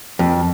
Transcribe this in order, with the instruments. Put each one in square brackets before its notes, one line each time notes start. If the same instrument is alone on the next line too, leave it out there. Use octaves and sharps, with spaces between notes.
[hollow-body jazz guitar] F2